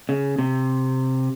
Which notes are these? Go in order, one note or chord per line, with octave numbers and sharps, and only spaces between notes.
C#3
C3